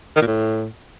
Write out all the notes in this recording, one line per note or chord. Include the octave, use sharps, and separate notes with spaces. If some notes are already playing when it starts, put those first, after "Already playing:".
D#3
A#2
A2